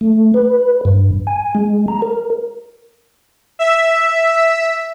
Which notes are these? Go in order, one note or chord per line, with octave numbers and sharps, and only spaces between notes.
A3
B4
G2
G#5
G#3
A#5
A#4
E5